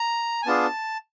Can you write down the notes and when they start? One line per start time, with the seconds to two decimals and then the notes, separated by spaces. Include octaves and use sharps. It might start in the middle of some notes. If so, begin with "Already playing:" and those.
Already playing: A#5
0.43 G#5
0.46 B3 D4 F4 G#4 A5